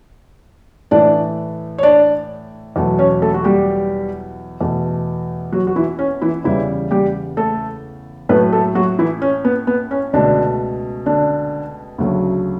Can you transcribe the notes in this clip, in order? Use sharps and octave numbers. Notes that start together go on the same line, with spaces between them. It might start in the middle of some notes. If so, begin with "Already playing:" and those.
A2 E3 A3 D4 D5
C#5
D4 D5
E2 B2 F#3 A3
C#4 C#5
A3 A4
F#4
G3 G4
E2 B2 A3
F#3 F#4
F#4
E3 E4
C#4
E3 E4
E2 C#3 E3 G3 E4
G3 G4
A3 A4
A2 F#3 A3 B3 B4
A3 A4
F#3 F#4
E3 E4
C#4
B3
B3
C#4
C#2 B2 D3 A3 D4
D3 D4
D2 C#3 F#3 A3